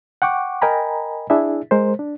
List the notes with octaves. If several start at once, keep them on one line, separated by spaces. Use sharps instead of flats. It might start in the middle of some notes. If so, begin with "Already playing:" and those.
F#5 G5 C#6 D6
A#4 D#5 G5 G#5 A#5 B5
D4 E4 G#4 E5
G#3 A#4 C5
D4